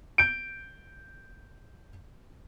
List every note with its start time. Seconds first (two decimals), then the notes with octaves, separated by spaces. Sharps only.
0.18 G6 D7